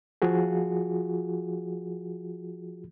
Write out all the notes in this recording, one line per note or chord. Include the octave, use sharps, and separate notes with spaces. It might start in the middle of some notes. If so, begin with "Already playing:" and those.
F3 F4 F#4 G#4